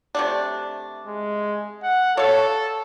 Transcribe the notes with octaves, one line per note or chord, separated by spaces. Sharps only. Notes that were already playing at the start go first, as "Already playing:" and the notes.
C3 A3 D4
G#3
F#5
A4 C#5 F5